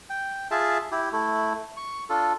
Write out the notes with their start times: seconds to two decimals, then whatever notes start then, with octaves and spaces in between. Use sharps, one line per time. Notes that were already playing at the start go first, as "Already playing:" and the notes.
0.10 G5
0.51 F4 G#4 E5 A5
0.92 E4 G4
1.12 A3 E4
1.77 C#6
2.09 D4 F4 A4